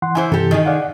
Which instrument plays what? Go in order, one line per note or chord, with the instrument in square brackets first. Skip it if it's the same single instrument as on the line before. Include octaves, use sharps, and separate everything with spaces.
[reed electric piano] E3 F#5 C6
[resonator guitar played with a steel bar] E3 E4 C5 [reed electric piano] G#5
[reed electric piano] G2 C3 E3 [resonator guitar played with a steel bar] G4 A4
[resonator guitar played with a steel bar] D#3 D#4 G#4
[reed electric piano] D5 F5 F#5